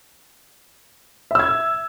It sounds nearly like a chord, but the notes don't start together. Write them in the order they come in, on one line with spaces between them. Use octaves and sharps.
E5 E6 G#6